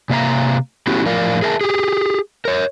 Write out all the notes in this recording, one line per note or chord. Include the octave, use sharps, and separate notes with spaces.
C3 A#3 E5 F5 A#5
A3 B3 C#4 E4 F#4 G4
A2 F3 A#4 D5 F5
G#4 A#4 E5 G5 A5
G4 G#4
A#4 C#5